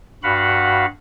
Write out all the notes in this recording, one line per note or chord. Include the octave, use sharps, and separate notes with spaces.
G2 F#4 F5 F#5 B5